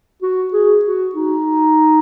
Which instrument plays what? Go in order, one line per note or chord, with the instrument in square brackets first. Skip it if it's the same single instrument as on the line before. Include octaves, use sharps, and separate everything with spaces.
[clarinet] F#4
G#4
F#4
D#4